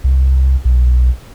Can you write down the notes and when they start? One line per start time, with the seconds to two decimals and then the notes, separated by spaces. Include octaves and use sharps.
0.04 C2
0.65 B1